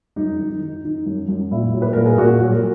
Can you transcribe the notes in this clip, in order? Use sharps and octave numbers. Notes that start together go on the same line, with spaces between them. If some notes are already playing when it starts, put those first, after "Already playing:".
F#2 D#4
D#3
D#4
D#3
D#3 D#4
F#2
F#2
A#2 E4
F#3
B4
A#2 A#4
G#4
A#2 F#4
F#3
A#4